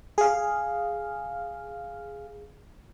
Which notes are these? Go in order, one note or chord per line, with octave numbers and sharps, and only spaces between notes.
G#4 F5